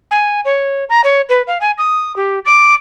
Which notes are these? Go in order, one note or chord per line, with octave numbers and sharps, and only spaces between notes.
G#5
C#5
A#5
C#5
B4
F5
G#5
D#6
G4
D6